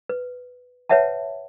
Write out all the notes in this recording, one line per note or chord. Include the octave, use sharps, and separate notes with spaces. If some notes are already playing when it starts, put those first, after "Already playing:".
B4
B4 C#5 E5 F#5 A5